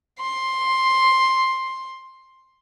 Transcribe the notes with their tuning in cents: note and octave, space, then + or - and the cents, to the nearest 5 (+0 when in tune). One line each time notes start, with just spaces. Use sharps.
C6 +10